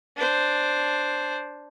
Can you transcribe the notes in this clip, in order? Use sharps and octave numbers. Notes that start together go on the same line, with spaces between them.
D4 C5